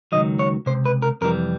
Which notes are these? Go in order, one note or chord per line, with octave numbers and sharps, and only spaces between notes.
C3 D#3 F#3 D#5
C#2
C#5
C#2 C3 C5
B4
A#4
F2 C3 E3 G3 A#4